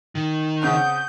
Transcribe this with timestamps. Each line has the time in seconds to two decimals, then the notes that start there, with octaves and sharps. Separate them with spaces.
0.15 D#3
0.62 C#3 C4 F#5 D#6 G6